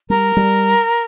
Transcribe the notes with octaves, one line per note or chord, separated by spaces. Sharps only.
G3 A#4
G3